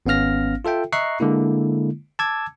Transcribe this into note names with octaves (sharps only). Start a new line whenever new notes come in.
G#1 B3 C#4 F5 F6 A#6
F4 A4 E5 G5
D#5 E5 A#5 C#6 F#6 C7
D3 G#3 A#3 E4
A5 D6 E6 G#6